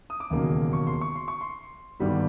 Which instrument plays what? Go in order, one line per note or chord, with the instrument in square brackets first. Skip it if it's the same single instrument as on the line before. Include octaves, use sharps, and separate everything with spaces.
[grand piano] D#6
D6
E1 D#2 C#3 F#3 A#3
C#6
C6
C#6
C6
C#6
C6
G#1 G2 D3 G3 B3